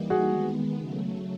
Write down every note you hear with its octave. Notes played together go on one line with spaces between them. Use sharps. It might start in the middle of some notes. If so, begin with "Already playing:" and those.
Already playing: E3 G3 A#3 D#4
F#4 G#4
D#3 G#3 B3
C#3 F#3 A3